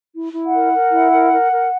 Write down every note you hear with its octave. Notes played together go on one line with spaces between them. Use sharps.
E4
E4
F#5
A#4
A#4
E4
A#4
A#4
A#4